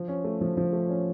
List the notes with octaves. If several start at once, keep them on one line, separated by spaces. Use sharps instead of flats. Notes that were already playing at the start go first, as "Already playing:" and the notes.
Already playing: F3
C#4
A3
F3
F3
A3
C#4